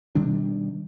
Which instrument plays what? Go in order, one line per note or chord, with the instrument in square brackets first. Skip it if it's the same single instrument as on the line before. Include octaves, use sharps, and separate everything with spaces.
[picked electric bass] B2 D#3 G3 D4